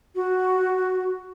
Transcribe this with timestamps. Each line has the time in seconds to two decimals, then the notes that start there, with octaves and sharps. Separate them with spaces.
0.15 F#4